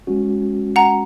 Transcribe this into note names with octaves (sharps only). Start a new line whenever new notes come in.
G#3 C#4 F#4
F#5 A#5